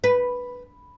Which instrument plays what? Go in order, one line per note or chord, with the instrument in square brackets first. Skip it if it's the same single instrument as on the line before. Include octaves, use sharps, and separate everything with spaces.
[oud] B4